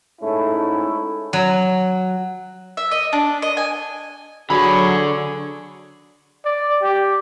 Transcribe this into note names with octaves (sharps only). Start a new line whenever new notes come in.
G#2 A3 C#4 D#4 E4
F#3
E5
D#5
D4
D#5
G#5
D3 F#3 G#4 B5 C#6
D5
G4